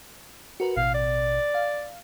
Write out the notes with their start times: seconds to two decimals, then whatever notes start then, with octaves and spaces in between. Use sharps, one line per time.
0.60 F#4 A#4 B4
0.77 A1 B2 F5
0.94 D5
1.54 F5